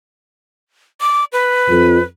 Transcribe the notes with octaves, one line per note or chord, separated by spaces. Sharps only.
D6
B4
F2